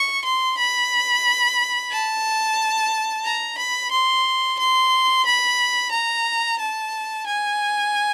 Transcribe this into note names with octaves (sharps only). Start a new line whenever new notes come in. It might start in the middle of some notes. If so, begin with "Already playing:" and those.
Already playing: C#6
C6
B5
A5
A#5
B5
C6
C6
B5
A#5
A5
G#5